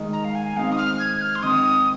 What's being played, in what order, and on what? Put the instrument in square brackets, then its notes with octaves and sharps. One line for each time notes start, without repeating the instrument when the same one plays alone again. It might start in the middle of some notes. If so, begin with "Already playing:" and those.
Already playing: [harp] D#3 G#3 D#4
[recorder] A#5
F5
G#5
[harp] G#3 C4 D#4 C5 [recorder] F5
[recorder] D#6
F6
G#6
F6
C6
[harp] D#3 C4 D#4 [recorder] D#6